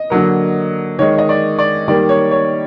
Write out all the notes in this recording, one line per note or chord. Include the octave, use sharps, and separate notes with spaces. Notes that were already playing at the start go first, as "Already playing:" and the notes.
Already playing: D#5
D3 F#3 A#3
D#3 G#3 C#5
D#5
D5
D5
D#3 G3 A#3 D5
C#5
C#5